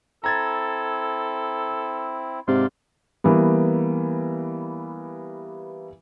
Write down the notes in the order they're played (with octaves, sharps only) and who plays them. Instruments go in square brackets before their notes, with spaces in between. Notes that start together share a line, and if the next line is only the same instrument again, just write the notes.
[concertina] C4 E4 [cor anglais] A4 [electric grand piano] A#5 G#6 A6
[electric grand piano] G#2 [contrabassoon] C3 [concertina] D5 F5 C6
[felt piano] E3 G3 A#3 B3